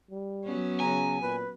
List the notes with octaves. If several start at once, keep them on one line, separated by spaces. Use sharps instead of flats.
G3
F#3 B3 C#4
C#3 G#5 A#5
A#2 B4